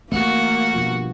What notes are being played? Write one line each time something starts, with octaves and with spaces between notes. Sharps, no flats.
E3 A3 A#3 C4 F#4
G2 B2 F3